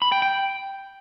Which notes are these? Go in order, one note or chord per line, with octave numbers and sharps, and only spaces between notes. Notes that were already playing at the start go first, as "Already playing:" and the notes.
B5
G5
G5